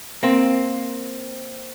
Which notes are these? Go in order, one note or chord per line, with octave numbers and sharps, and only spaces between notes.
A#3 C4